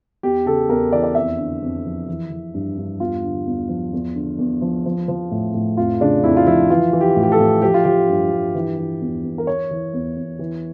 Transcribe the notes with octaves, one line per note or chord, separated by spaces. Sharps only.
E2 G4
C#3 A4
E2 A#4
E3 D5
D5
F2 E5
D3
F2
F3
E3
E3
G2
G2
E2 F4
D3
E2
F3
E2
D3
E2
F3
F3
F3
A2
A2
F2 F4
C#3 D4
F2 E4
F4
F3 E4
E3 F4
E3
G4
A2
G4
A4
A2
F3 G4
F4
F3 G4
G2
G2
E3
E3
E2
E2
A#4
E3 C#5
E3
E2
E2
E3